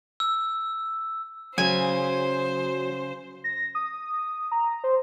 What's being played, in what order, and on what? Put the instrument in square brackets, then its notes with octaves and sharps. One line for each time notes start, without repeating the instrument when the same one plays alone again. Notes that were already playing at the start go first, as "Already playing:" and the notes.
[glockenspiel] E6
[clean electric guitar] C#3 [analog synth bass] F#3 [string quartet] C5 [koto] G#5
[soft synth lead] A#6
D#6
A#5
C5